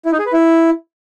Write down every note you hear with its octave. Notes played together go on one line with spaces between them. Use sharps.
E4
D#4
G#4
B4
E4